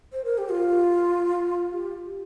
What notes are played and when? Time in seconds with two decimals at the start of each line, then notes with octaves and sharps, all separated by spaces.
0.13 C5
0.24 A#4
0.38 G4
0.49 F4
1.72 G4